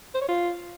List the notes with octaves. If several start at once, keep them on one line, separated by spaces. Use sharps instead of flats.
C5
C#5
F4